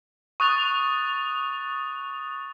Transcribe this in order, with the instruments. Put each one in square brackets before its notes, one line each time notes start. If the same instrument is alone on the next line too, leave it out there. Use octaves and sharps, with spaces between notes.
[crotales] C#6 D#6 F#6 A6 F7